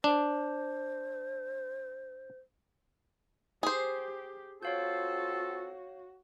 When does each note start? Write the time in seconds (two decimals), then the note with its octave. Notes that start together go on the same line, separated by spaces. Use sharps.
0.04 D4 C5
3.63 G4 G#4 C5
4.63 C4 F4 F#4 A4 C#5 F5 G6